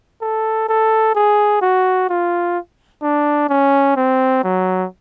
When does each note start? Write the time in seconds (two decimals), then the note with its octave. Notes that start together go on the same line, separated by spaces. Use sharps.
0.22 A4
0.69 A4
1.15 G#4
1.62 F#4
2.09 F4
3.03 D4
3.49 C#4
3.97 C4
4.43 F#3